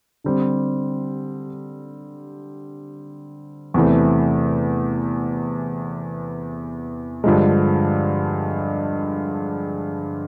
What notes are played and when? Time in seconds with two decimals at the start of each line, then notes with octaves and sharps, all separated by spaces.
0.24 D3 G3 C4
3.74 E2 C3 E3 A3
7.24 G2 D3 F3 G#3